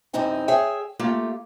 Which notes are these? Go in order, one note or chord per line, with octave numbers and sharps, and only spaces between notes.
F#2 C3 E3 C4 D#4 G#5
G#4 C#5 E5 G5 G#5
A3 A#3 F4 G4